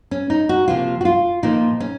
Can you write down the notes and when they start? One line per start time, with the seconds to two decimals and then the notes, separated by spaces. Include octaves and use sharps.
0.11 C#4
0.30 D#4
0.49 F#4
0.68 C3 F3 A#3 F4
1.01 F#4
1.05 F4
1.43 A#2 F3 A#3 D#4
1.80 C#4